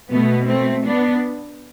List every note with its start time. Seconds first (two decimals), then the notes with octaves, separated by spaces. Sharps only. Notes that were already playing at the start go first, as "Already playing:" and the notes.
0.11 B2 A3 B3
0.48 A3 C4
0.86 B3 D4